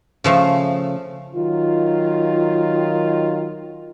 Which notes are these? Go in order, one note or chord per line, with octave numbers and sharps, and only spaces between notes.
C#3 F3 A3
D#3 F#3 F4